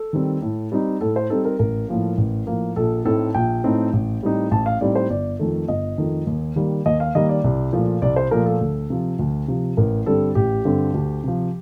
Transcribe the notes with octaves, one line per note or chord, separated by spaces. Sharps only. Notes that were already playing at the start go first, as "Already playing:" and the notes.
Already playing: A4
D#3 G3 C4
A2
G3 C4 D#4
A2 A4
C5
G3 C4 D#4 A4
A#4
A1 A#4
A2 F3 A#3
A1
A2 F3 A#3
A#1 A4
A2 A3 C4 D#4 A4
A#1 G5
A2 A3 C4 D#4
A1
A2 G3 C4 D#4
A1 A5
F5
A2 G3 C4 D#4 D5
C5
G1 D5
F2 D#3 A3
G1 D#5
F2 D#3 A3
D#2
D#3 G3 A#3
D#2 D#5
F5
D#3 G3 A#3 D#5
D5
C2
A#2 F3 A3
C2 D5
C5
A#2 F3 A3 A#4
A4
D2
C3 F3
D2
C3 F3
A1 A#4
G2 D3 G3 C4 A4
A1 G4
G2 D3 G3 C4
D2
C3 F3